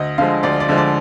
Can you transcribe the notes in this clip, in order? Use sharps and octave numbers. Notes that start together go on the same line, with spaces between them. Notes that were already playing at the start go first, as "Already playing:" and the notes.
Already playing: D2 D#5
D3 F3 G#3 F5
D2 D5
D5
D3 F3 G#3
D5